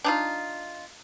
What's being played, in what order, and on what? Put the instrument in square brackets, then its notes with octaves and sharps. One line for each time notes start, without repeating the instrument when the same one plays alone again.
[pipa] D4 D#4 F4